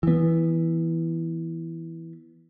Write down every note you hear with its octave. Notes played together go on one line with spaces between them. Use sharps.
E3 B3